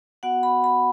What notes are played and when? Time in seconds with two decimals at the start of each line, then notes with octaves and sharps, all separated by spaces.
0.23 B3 F#4 F#5
0.43 B5
0.64 B5